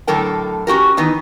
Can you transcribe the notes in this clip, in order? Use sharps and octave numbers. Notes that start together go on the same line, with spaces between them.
A2 D3 F#3 A4 A#4 G5
C#4 F#4 G4 A#4
D#3 E3 B3 D#4